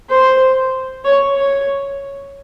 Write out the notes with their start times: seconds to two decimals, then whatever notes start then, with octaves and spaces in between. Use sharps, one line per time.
0.10 C5
1.04 C#5
1.35 C#5